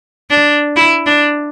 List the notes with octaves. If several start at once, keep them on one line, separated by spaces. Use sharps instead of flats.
D4
E4
D4